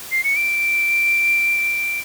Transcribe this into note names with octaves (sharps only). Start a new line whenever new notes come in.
C7
C#7
D7